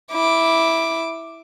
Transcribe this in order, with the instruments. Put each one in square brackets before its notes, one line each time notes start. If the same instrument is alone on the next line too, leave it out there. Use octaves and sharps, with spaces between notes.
[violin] E4 D6